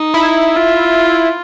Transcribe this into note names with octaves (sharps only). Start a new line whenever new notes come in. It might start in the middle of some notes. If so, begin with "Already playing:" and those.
Already playing: D#4
E4
F4